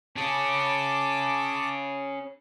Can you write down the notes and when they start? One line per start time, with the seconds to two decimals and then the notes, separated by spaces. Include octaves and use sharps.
0.16 C#4 G#4 A5 D6